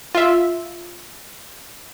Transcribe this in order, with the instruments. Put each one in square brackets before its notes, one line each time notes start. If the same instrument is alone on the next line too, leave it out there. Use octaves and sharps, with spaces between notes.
[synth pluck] F4 E5